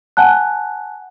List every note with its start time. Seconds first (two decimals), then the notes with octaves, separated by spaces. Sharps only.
0.17 F#5 G#5 A5 F#6